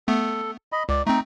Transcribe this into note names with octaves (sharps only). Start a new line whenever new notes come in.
A3 B3 A4
D#5 B5
C#2 D5
A3 C4 D#4